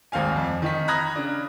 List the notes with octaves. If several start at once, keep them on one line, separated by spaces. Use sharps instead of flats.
G#1 D#2 C4 F5 G#5
F2
D#3 D#4 B6
A#5 B5 D#6 F#6 G#6 A#6
C#3 D4